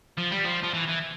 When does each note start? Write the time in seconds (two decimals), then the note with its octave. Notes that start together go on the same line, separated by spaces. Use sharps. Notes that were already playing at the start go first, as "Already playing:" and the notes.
0.18 F3
0.31 G3
0.44 F3
0.63 F3
0.74 E3
0.89 E3